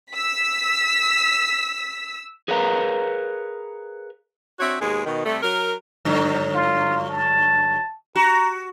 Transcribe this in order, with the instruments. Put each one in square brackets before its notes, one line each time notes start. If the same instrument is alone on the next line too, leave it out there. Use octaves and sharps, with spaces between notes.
[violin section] E6 B6
[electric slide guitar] G#4 A#4 B4 C#5 F5 A#5
[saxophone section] C4 D4 F#4 C#5 E5
D#2 B2 G#3
B2 D#3
C3 G3 A3
F#3 A#4
[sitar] G2 D3 F#3
[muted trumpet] F4
A5
[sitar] F#4 [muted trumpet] A#5